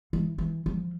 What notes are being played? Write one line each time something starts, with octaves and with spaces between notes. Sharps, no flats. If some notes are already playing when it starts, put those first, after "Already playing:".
E3
E3
F3